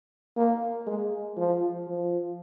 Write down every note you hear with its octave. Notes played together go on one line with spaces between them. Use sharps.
A#3
G#3
F3
F3